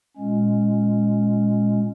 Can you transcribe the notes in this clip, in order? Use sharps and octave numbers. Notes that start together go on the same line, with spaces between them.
A#2 G#3 C#4